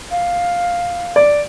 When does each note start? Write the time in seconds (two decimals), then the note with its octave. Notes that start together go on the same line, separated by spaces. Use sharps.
0.11 F5
1.16 D5